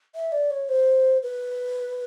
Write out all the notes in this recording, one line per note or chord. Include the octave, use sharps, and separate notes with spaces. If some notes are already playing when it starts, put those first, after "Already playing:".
E5
D5
C#5
C5
B4